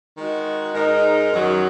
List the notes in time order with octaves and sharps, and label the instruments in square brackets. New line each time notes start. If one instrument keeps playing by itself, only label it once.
[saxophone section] D#3 G#3 F#4
G#2 G#3 D#4 A#4
F#2 D#3 F#3